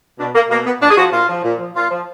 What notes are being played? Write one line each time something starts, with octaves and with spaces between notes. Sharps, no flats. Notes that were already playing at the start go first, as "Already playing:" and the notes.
B2 D4
A#3
B2 A#3
B3
A#2 D4
G#4
F3 F#4
A#2 F4
F3
A#2
F3
A#2 F4
F3